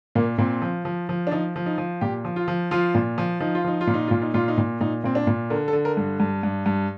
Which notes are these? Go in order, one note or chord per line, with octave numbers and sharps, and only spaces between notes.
A#2 A#3
A#2 C4
F3
F3
F3
D4
F3 D#4
F3
D#4
F3
A#2 G4
F3
F4
F3
F3 F4
A#2
F3
F3 D#4
F4
F3 D#4
F4
A#2
D#4
A#2 F4
D#4
A#2 F4
D#4
A#2
A#2 D#4
A#2 C4
D4
A#2
D3 A#4
A4
D3
A#4
G2
G2
G2
G2